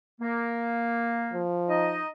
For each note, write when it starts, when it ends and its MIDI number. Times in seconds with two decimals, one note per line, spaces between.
0.21 1.41 58
1.34 2.01 53
1.69 2.07 63
1.69 2.07 75